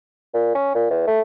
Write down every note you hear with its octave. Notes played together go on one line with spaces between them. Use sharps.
A#2
C#4
A#2
E2
A3